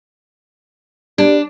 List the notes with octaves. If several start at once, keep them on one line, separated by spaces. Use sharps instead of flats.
G3 D4